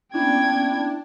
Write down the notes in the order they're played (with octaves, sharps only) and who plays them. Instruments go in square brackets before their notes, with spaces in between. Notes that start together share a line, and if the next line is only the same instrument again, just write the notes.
[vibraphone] A#3 B3 C#4 [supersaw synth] D4 [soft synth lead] E4 [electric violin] G5 G#6